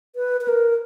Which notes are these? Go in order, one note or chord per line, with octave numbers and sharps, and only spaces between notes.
B4
B4
A#4